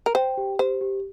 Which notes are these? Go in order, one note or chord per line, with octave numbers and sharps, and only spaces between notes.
A#4
C5 G5
G4
G4 C5
G4